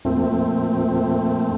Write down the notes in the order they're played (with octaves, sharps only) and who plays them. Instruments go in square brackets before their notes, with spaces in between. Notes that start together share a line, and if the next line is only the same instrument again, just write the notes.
[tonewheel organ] F2 A#2 A3 C4